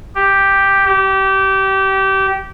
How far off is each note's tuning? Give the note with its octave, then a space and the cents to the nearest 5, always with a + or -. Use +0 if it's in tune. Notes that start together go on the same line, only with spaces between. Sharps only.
G4 +0
G4 -25